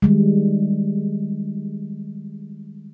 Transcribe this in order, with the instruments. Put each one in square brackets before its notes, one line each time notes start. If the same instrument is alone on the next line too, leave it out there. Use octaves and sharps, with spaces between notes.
[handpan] D#3 G3 G#3